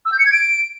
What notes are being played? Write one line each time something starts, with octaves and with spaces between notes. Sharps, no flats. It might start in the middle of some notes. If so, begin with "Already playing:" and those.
E6
G6
C#7
G#6
D7